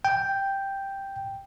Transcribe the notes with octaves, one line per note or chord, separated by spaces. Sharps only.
G5